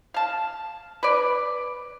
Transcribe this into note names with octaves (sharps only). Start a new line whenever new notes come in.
F5 A5
B4 D5